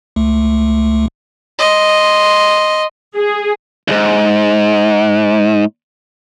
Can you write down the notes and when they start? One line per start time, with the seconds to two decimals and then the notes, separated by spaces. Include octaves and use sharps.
0.16 C#2 A3
1.59 D#5 C6
3.15 G#4
3.88 D2 G#2